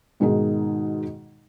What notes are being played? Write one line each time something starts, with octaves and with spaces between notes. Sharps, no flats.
G#2 B2 D#3 G#3 D#4 G#4